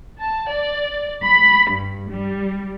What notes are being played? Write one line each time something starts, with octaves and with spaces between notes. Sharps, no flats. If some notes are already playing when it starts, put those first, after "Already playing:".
A5
D5
B5
G2
G3